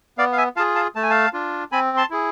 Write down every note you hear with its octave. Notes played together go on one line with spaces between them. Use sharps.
B3 D5 F5
F5
E5 G#5
F4 G#4 F5 A5
F5 A5
A3 A5
G#5
F5 A5
D4 F4
C4 G#5 B5
A5 C6
E4 G#4